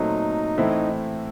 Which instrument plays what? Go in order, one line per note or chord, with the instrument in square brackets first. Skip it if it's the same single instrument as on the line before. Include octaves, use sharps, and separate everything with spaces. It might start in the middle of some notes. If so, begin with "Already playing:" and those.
Already playing: [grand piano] A#2 F#3 A3 C4 [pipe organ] D#4
[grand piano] A2 E3 A3 C4 E4